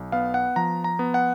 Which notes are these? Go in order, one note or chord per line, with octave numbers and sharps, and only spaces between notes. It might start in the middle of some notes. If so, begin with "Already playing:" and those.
Already playing: B1
B3 F5
F#5
F3 A#5
A#5
B3
F#5